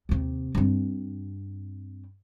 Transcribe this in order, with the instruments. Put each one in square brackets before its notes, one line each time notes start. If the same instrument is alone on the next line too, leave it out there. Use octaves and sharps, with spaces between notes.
[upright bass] D#2 C3
G2 C4